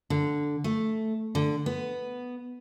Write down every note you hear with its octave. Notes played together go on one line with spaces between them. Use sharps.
D3
A3
D3
B3